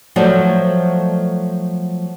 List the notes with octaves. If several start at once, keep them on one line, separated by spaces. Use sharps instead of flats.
F3 F#3 A3 F#4 C5 D5